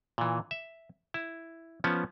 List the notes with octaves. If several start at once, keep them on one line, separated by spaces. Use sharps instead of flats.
A#2 E3
E5
E4
F3 B3 C#4